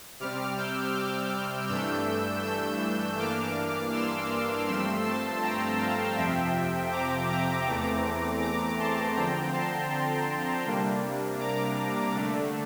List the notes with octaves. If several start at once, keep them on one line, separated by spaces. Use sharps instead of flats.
C3 G3 C4 D6 F6
E6 G6
D6 F6
G2 E3 A3 D4 E6 G6
E6 G6
G2 E3 A#3 D4 D6 F6
C6 E6
G2 F3 A3 C4 C6 E6
A5 C6
G5 A#5
F5 A5
F2 C3 F3 C4 E5 G5
A#5 D6
A#5 D6
E2 E3 A3 C4 A#5 D6
A#5 D6
A5 C6
D3 F3 C4 G5 A#5
A5 C6
C3 G3 A#3 D4
A#5 D6
D3 A3 D4